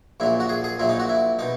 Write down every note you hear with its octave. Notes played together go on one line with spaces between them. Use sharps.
A#1 A#2 F#3 E4
F#4
G#4
G#4
A#1 A#2 F#3 E4
D#4
F#4
E4
B2 D#4